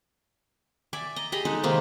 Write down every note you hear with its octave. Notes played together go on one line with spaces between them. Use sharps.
D5 E5 G#5
D#5 A#5
G4 G#4 D#5 B5
G#3 D#4 A4 B4
C3 D#3 G#3 A#3